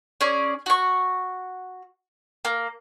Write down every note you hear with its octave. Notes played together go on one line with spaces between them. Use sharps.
C#4 G#4 D5
F#4 C#6
A#3